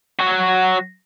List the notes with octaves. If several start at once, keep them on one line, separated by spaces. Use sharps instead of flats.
F#3 F#4